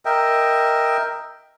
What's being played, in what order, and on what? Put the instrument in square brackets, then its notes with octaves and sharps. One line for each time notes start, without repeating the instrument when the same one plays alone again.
[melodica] A#4 D#5 E5 G5